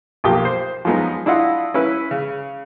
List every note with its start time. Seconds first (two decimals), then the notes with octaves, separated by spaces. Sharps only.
0.24 B1 F3 A#3 G4 G5
0.45 C5
0.85 F3 F#3 G#3 B3 D#4
1.26 D4 E4 F4 D#5 F#5
1.74 C#4 E4 B4
2.11 C#3